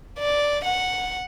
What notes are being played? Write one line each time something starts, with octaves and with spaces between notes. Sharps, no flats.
D5
F#5